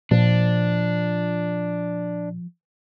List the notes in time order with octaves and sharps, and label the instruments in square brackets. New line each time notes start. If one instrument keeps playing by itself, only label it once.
[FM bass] A#2 [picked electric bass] F3 [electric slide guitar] D4